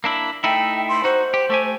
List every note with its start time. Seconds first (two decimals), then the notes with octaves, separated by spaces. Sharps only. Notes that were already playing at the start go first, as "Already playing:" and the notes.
0.04 A#3 D4 E4
0.44 A3 D#4 E4 G5
0.88 C6
1.04 D#4 F#4 C5
1.34 G4
1.50 A3 G4 G#5